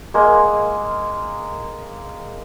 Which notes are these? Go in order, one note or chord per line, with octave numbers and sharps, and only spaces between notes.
G#3 A#3